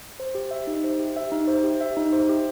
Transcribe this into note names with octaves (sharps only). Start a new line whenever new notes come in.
C5
G4
E5
D#4
C5
G4
E5
D#4
C5
G4
E5
D#4
C5
G4